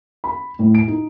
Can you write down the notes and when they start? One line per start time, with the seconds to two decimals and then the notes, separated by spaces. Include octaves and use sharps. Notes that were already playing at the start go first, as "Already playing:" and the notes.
0.24 B5
0.59 A2
0.75 D7
0.88 D#4